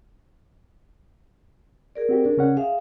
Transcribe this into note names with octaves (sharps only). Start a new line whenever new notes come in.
G#4 A#4 D5
C4 F#4 G4
D4
C#3 C#4 F#5
G#4 E5 F5